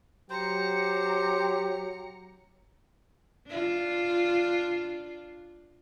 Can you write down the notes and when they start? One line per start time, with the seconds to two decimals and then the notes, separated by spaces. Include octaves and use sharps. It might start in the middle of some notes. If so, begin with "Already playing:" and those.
0.30 F#3 G4 C5 A#5 C#7
3.48 D4 F4